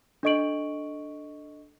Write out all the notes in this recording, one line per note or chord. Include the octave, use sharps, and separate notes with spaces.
D4 A4 D#5 C#6 D7 F#7